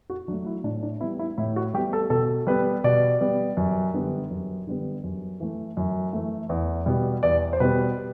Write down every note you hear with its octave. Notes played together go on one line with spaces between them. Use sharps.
F#4
F#3 A3 D4
E4
A2 D4
D4
G3 B3 E4
E4
A2 E4
F#4
G3 B3 G4
A4
B2 A4
G3 B3 B4
B2 D5
G3 B3
F#2
D3 G3 B3
F#2
D3 G3 B3
F#2
E3 A3
F#2
E3 A3
E2
B2 G3 B3
E2 D5
C5
B2 G3 B3 B4